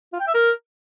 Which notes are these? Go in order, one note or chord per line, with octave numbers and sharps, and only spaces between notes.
F4
G5
E5
A#4